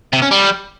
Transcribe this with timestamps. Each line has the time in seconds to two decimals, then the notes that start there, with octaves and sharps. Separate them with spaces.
0.13 C3
0.22 C#4
0.32 G3